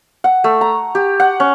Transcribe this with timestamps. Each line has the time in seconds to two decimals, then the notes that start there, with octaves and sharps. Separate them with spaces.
0.24 F#5
0.44 A3
0.61 A#5
0.95 G4
1.20 F#5
1.40 C#4